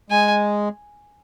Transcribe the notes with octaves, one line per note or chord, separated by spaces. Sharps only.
G#3 G#5